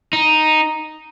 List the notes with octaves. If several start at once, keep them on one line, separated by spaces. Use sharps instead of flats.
D#4